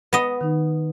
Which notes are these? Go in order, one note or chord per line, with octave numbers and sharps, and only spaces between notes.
B3 D#5
D#3 D#4